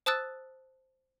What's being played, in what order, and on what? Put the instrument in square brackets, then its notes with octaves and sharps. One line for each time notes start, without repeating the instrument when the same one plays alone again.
[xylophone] C5 A5 D#6 E6 F#6 A6